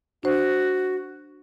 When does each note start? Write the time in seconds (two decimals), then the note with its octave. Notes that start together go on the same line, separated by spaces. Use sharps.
0.23 D4 F#4 C5